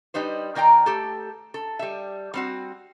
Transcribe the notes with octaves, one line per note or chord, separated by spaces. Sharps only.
G3 D#4 B4 C5
D#3 A#3 D5 G5 A#5
A3 G4 A4
A4
G3 E5
G3 C4 F#4